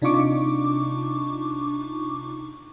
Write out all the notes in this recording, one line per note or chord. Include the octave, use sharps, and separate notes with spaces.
C3 D4 D#4 F4 C#6 D6